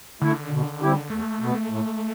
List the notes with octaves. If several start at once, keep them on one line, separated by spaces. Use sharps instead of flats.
D3 A3 E4
B2
G3 C4 E4 G4
E2 A3
B2 B3
A2